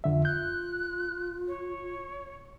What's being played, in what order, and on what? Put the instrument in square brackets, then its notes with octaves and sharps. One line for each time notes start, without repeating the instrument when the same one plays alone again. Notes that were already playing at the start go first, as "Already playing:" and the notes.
[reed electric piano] F2 D3 E5 [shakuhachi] F4
[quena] F#6 [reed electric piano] G6
[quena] C#5